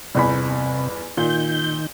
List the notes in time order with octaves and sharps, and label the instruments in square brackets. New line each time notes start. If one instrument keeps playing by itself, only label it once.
[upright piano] G1 E2 B5 [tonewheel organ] C3
[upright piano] A#2 [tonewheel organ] D#3 G6